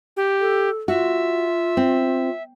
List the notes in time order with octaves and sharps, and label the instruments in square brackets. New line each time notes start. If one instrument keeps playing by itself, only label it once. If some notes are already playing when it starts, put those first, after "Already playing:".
[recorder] G4
[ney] A4
[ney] F4 [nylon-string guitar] F#4 [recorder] E5
[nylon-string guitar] C4